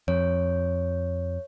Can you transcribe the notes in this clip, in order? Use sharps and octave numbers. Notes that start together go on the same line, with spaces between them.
F2 C#5